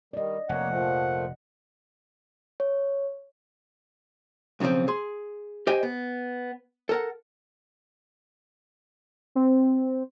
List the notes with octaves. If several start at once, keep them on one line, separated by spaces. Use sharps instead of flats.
D#3 G3 D5 D#5
F1 A#3 C#5 F#5
A#2 F3 A3
C#5
B1 C#3 E3 F3 C4
G#4 C6
G4 C5 D#5 G#5
B3
A4 A#4 F#5
C4